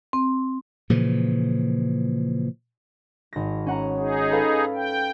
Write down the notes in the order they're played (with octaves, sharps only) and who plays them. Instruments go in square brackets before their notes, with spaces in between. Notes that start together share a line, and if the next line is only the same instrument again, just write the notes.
[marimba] C4
[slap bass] A#2 C#3 E3 F3
[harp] G#1 A#6
C#4 F#5 A#5
[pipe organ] D#4 G#4
[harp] A4 B4 F5
[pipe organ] G5